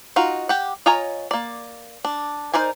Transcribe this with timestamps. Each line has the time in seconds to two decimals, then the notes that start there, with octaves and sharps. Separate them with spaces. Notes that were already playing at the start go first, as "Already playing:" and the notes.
0.16 D#4 F4 F#4
0.49 G4 F#5
0.86 F4 C#5 D#5 G#5 A#5
1.31 A#3 D5
2.04 D4
2.53 D#4 A#4 C5 D5 G#5